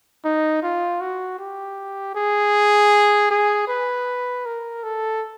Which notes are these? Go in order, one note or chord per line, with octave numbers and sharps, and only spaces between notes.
D#4
F4
F#4
G4
G#4
G#4
B4
A#4
A4